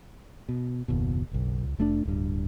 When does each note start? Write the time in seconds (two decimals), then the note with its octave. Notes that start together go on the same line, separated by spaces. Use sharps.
0.49 B2
0.88 F#1 D#2 B2
1.31 F#1 B1
1.63 C#2
1.78 F1 A3 C4 D4
2.05 D1 G2